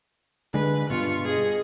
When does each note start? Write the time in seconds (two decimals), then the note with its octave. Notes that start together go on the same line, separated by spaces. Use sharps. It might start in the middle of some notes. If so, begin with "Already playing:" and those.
0.54 D3 G#3 B4
0.90 G2 B2 F4 C#6
1.24 G#4 D#5